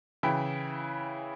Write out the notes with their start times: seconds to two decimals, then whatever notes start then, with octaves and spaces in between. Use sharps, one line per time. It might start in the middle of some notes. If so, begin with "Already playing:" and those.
0.23 C#3 E3 E4 G5